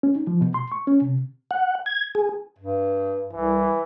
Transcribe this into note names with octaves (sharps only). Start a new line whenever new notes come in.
C#4
D#4
F3
B2
C6
C#6
C#4
C3
F#5
G#6
G#4
G2
C2 E3